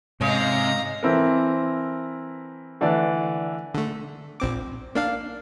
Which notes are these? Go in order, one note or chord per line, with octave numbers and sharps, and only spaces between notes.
G#2 C3 C#4 D#5 F5 A#5
E3 C4 E4 A4 A#4
D3 E3 A3 D4 D5
D3 A3
A#1 C4 D6
A#3 D4 F5